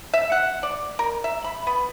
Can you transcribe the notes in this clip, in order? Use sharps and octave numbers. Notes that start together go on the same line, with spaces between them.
E5
F#5
D5
A#4
E5
B5
B3